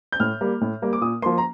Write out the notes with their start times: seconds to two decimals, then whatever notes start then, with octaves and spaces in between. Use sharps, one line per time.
0.12 G6
0.20 A2 F6
0.41 G3 A#3
0.61 A2
0.82 G3 A#3
0.93 D6
1.01 A#2 D#6
1.22 F3 A#3 C6
1.38 A#5